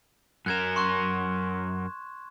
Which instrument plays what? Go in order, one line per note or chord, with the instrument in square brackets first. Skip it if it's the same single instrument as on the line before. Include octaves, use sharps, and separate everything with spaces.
[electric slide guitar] F#2 A#4 [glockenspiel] F#6 G#6 E7
[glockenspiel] C6 C#6 F#6